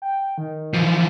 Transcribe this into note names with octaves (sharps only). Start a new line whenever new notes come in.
G5
D#3
E3 F3